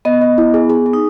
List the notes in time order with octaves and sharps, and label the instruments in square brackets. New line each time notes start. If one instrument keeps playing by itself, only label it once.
[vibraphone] B3 [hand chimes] D#5
[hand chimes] D#5
E4
G#4
G#4
G#4
[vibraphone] D#4